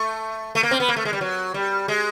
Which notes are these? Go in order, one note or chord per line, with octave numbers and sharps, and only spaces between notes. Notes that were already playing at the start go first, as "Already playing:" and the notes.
Already playing: A3
A3
A#3
C4
B3
A#3
A3
G#3
G3
F#3
G3
G#3